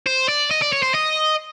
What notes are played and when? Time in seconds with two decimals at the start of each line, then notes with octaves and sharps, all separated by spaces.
0.06 C5
0.28 D5
0.51 D#5
0.62 D5
0.73 C#5
0.83 C5
0.95 D#5